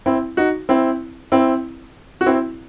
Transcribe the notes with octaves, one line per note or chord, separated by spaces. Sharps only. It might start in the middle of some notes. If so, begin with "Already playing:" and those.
C4 E4
D#4 F#4
C4 E4
C4 E4
F#4
C4 E4